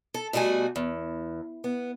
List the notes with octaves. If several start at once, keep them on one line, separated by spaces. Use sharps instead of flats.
A4
B2 G3 A3 F#4 G#5
E2
B3